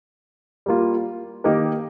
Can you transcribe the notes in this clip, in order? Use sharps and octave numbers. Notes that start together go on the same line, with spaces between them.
G3 A#3 F4
D#3 A#3 D#4 G4 A#4